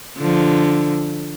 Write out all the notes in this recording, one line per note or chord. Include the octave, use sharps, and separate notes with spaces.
D3 F3